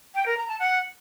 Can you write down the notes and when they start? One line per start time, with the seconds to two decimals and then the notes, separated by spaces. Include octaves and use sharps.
0.15 G5
0.26 A#4
0.37 A#5
0.49 A5
0.60 F#5